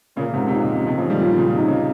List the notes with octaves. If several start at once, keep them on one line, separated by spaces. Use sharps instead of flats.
A#2 C#3 A#3
G#2 C3
C3
A#2 C#3 D#4
C3 D#3
C#3 F3
D#3 G3
A#2 C#3 F4
D#3
A#2 C#3
C3 D#4
C#3